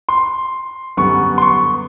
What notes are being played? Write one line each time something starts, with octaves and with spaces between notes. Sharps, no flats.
C6
F#2 D3 G3 B3 C#6
C6
C#6